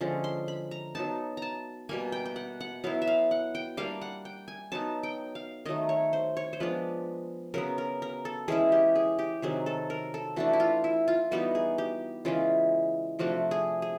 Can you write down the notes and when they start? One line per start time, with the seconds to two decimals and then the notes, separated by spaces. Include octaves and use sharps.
0.01 D3 F3 G#3 C#4
0.24 C6
0.48 B5
0.71 A#5
0.95 F#3 B3 D#4 A5
1.37 A5 A#5
1.89 B2 G3 A#3 G#5
2.12 G5
2.25 G5
2.36 F#5
2.61 F#5
2.84 F#3 B3 E4 F5
3.02 E5
3.07 F5
3.31 F#5
3.55 G5
3.77 G3 A#3 D4 F5
4.02 F#5
4.25 G5
4.48 G#5
4.72 F#3 B3 D#4 A5
5.03 G5
5.35 F5
5.65 D#3 F#3 A3 D#5
5.89 C#5
6.13 C5
6.37 C#5
6.53 C5
6.60 F3 G#3 B3 D4 B4
7.54 C#3 F#3 B3 A#4
7.78 A#4
8.02 A#4
8.25 A4
8.48 E3 G#3 C#4 E4 G#4
8.72 G4
8.95 G#4
9.19 G4
9.42 C3 D#3 F#3 G#4
9.66 A4
9.90 A#4
10.14 A4
10.36 E3 A3 D4 F#4
10.53 E4
10.60 F4
10.84 E4
11.08 F4
11.31 E3 G3 B3 D#4 F#4
11.55 G#4
11.78 G4
12.25 C#3 E3 G#3 F4
13.19 C3 F3 A3 D4 F#4
13.51 G#4
13.82 G#4